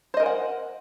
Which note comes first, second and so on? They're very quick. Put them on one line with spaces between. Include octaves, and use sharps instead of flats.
C5 D#5 A#4 G#5 F#5